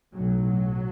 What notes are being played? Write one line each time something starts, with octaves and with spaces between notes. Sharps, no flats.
B1 A2 F#3